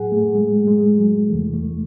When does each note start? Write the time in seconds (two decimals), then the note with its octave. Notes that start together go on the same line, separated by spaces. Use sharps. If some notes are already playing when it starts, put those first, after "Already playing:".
Already playing: A2 F#3 G#4 F#5
0.12 A3
0.35 G#3
0.67 G#3
0.98 F#3
1.29 E2 C3 E3 A3
1.53 A3